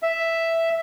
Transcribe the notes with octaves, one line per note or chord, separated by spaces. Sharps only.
E5